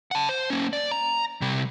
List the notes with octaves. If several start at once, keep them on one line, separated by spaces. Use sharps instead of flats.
F#5 A5
C5
A#3 C#4
D5
A#5
C3 G3